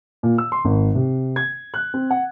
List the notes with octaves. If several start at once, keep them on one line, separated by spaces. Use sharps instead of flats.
A#2
E6
C6
G#1
C3
G#6
F#6
C4
F#5